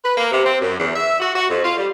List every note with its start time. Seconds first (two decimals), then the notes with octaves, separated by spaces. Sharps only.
0.04 B4
0.18 A#3
0.32 C3
0.44 C4
0.61 F#2
0.80 E2
0.96 E5
1.20 F#4
1.35 F#4
1.49 F2
1.64 F4
1.78 G3